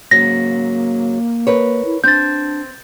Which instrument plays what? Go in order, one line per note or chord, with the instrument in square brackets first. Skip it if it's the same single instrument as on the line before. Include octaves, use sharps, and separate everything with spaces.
[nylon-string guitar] G#2 C#3 F#3 [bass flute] A#3 [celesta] A#6
[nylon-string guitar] A#4 B4 C#5
[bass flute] E4
[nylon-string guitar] C4 [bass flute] D4 [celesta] G6 A6